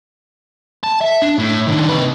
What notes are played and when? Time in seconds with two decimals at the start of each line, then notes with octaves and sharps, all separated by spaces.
0.84 A5
1.01 E5
1.22 D4
1.39 A2
1.67 D#3 D4
1.89 C3 B4